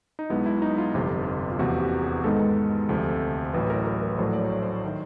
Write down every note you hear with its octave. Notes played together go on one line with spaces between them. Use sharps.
D#4
B1 B2 G#3 B3 E4
E4
D#4
F4
G1 F2 C3
F4
E2 C3 F3 A#3 F#4
G4
G#4
G#2 D#3 G#3 B3 A4
D2 C3 F3 A3
A1 A2 F#3 B4
A#4
A#4
A#4
A#1 A2 F#3 A3 C5
D5
C#5
C5
D#3